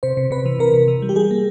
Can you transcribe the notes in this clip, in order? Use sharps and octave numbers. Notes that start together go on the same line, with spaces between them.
C3 C5
C3
C3 B4
E3
C3 A#4
C3
E3
G3
G4
G3 G#4
A#3